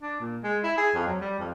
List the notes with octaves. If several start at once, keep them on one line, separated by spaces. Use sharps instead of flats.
D4
A#2
G#3
E4
G#4
F2
F#3
G3
F2